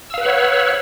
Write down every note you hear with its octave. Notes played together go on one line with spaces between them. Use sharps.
B4 C#5 F5 F#5 E6